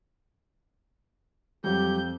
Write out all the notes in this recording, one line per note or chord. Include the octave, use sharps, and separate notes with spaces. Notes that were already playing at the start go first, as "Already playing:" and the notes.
F2 F#3 G3 G4 G6